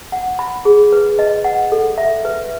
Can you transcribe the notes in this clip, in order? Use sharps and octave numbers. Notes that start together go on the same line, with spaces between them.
F#5
B5
G#4
B4
D#5
F#5
A4
E5
B4